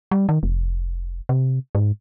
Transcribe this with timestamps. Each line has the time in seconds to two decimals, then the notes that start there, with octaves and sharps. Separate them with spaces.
0.11 G3
0.29 D#3
0.43 F1
1.29 C3
1.75 G#2